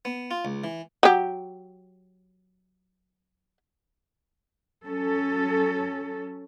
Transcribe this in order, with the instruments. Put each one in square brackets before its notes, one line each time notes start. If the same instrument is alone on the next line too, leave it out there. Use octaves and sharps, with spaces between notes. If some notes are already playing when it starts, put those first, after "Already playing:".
[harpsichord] B3
F4
C#2
E3
[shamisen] F#3 G4
[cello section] F#3 C#4 A4